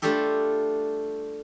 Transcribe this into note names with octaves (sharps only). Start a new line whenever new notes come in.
G3 A3 D4 F4 G4 A4